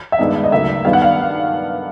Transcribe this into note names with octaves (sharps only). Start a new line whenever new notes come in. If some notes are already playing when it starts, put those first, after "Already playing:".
E5
G2 D#3 G#3 B3 D#4 D#5
D#5
D2 C#3 F#3 A#3 D#4 E5
G2 D#3 G3 B3 F5
F#5
F5